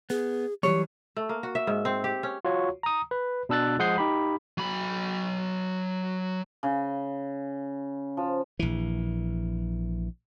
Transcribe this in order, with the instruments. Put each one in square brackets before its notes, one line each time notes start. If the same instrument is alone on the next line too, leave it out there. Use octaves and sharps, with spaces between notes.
[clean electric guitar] B3 [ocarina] G#4
[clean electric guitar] E3 F#3 G3 [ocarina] G4 [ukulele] C#5
[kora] A3
A#3
F#4
E5
G#2
C4
G4
C#4
[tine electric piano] F4 F#4 C#5
A#5 D#6
B4
B2 D4 E6 F#6 A6
F3 G#3 F#5 D#6 G6 C7
D#4 G4 B5
[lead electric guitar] F#3 B5
[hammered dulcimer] C#3
F3
[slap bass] A#1 E3